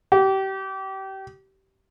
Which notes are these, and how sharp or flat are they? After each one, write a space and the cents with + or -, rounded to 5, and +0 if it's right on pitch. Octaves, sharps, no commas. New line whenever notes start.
G4 -30